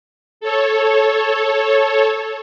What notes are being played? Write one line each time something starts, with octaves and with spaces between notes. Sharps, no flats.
A4 C#5